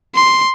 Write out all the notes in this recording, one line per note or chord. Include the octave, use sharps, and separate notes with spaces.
C6